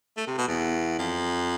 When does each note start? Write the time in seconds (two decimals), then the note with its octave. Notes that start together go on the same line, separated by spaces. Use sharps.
0.17 A3
0.27 C3
0.38 B2
0.48 E2
0.99 F2